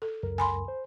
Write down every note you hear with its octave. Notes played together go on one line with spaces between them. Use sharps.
A4
C#2 F#2 A#4
G#5 B5 C6
C5